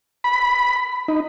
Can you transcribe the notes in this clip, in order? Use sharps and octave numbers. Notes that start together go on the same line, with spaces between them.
B5
D#4